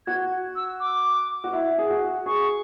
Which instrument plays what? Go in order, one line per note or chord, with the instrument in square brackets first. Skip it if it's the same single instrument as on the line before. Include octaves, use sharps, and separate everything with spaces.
[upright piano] F#4 [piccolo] G#6
[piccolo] E6
D6
[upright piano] F#4
E4
G#4
F#4
[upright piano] G#4 [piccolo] C#6